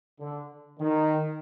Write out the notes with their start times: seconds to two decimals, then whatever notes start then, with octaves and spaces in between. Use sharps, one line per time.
0.20 D3
0.80 D#3